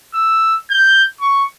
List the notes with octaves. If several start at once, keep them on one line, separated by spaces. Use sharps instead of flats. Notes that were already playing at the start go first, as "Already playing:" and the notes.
E6
G6
C#6